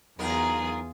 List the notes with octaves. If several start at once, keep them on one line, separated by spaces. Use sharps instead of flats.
E2 F#3 D#4 F4 G#4 A#4